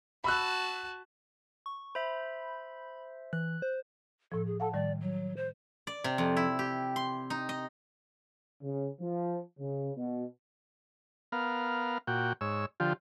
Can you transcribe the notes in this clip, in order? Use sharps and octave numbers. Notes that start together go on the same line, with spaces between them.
F#4 A5 B5 E6 F#6
C#6
C5 E5 B5
E3 F#6
C5
A2 F3 A4
G#4
A4 F5 F#5 A5
A2 D#3 G3 D5
F#3
C5
D5
C3
F2
E4
G4
C6
D#4
D#5
C#3
F3
C#3
B2
B3 A#4 F5
A#2 F#4 G5
G#2 C#5 E6
D3 F3 F4 G4